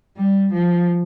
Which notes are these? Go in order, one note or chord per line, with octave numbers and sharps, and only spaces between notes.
G3
F3